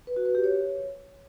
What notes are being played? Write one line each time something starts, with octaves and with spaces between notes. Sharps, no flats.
B4
F#4
B4
G4
C#5